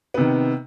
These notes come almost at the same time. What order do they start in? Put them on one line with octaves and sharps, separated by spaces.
B3 C3 D#3